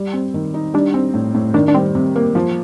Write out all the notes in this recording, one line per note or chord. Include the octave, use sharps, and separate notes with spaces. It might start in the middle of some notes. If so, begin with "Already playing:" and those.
Already playing: G3
C4
D#3
D#4
G3 D4
C4
A2
A2
D#3 D4
D4
G3 C4
C3
A#3
F3